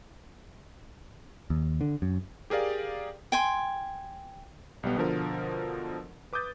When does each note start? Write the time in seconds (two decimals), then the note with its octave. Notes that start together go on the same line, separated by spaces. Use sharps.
1.50 D#2
1.81 D3
2.02 F#2
2.50 G4 G#4 A#4 D5 F5
3.32 G5 G#5 C6
4.83 B1 G3 B3
4.96 B2 D3 F3 A#4
6.33 B4 D6 D#6 G6 A6